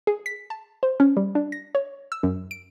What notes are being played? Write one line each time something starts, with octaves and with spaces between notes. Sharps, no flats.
G#4
B6
A5
C5
C#4
G3
D4
A#6
C#5
E6
F#2
D7